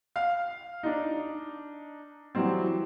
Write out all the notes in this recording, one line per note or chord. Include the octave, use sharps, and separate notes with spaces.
F5 F6
D4 D#4
E3 F#3 G3 C4